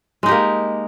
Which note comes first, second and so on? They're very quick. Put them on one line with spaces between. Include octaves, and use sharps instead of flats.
G#3 D#4 G4 A#3